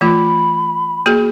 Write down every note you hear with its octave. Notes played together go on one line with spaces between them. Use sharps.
E3 A3 F4 B5
A#3 F#4 G#4